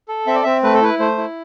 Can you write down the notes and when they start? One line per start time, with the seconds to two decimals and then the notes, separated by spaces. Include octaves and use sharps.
0.09 A4
0.27 C4 E5
0.35 D5
0.43 C4 E5
0.63 A3 B4
0.74 A4
0.81 E4 B4
0.99 A3 C5
1.18 E4